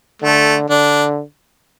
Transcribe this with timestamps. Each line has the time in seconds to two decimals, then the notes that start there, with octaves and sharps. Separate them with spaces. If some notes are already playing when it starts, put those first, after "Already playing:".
0.22 D3 A3
0.70 D3 D4